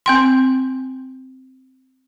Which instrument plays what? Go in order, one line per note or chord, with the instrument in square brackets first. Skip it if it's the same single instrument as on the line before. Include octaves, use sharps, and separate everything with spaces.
[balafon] C4 G5 C6